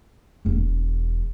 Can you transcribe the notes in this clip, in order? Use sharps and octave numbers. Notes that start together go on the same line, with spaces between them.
E1 E2